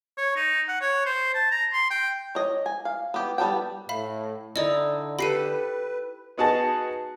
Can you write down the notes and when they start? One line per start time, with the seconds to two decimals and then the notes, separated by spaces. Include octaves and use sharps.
0.17 C#5
0.36 D#4
0.68 F#5
0.81 C#5
1.06 C5
1.34 A5
1.51 A#5
1.73 C6
1.91 G5
2.35 C#5 D#5
2.66 G#5
2.85 F5
3.14 B3 G4
3.38 G3 B3 A4 G5
3.89 A2 E5 F5 B5
4.56 D3 D#4 E4 D5 D#5
5.19 G4 A4 B4 B5 C7 D#7
6.38 B3 D#4 F#4 G#4 A5